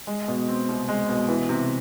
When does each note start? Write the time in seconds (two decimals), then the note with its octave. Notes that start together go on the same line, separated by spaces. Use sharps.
0.07 G#3
0.28 B2
0.48 C4
0.69 C2
0.89 G#3
1.09 B2
1.28 E3
1.49 C3